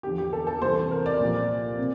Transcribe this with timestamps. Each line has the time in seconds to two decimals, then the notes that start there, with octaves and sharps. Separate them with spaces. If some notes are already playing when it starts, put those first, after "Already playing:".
0.03 E2 D3 F3 G4
0.18 G4
0.33 A4
0.47 A4
0.62 C2 C3 E3 C5
0.76 C5
0.91 A#4
1.06 D5
1.20 C2 A#2 F3
1.79 C3